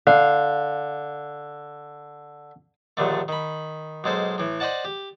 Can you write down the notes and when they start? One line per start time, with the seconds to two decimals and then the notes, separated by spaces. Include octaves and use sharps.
0.07 D3 F5
2.97 A#1 D#2 D3 A3
3.28 D#3 B5
4.04 B1 G#3 A4 C5
4.38 A2 E3
4.60 C5 D5 D#5 F#5 A5
4.85 G4